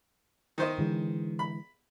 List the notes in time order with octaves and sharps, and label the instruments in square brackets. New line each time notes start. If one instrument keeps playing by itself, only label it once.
[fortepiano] D#3 C5 D#5
[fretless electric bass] D3 E3 G#3
[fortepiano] B5